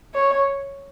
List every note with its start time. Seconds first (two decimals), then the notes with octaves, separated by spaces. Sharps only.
0.14 C#5